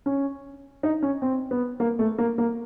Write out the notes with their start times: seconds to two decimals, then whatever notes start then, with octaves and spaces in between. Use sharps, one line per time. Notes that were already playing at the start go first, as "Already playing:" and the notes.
0.06 C#4
0.83 D#4
1.02 C#4
1.22 C4
1.51 B3
1.80 A#3
1.99 A3
2.18 A#3
2.38 A#3